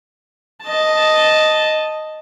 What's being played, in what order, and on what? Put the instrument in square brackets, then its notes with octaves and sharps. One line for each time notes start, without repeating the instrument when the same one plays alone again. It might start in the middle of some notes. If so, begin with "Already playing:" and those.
[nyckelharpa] D#5 A5